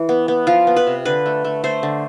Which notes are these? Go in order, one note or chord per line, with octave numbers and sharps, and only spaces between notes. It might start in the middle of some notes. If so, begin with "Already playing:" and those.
Already playing: E3
B3
B3
F3 F4
B3
B4
C3
D3 B4
A3
A3
A3 C5
D3